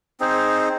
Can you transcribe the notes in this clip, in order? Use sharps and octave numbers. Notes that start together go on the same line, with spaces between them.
C4 D#4 G#4 C5